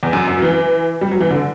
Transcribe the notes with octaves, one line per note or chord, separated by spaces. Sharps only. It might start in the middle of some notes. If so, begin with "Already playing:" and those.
E2
F#2
F#2
F#3
E3
G3
F#3
E3
D3